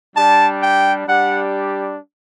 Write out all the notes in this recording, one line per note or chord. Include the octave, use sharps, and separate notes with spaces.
G3 D4 G4 A5
G5
G3 D4 G4 F#5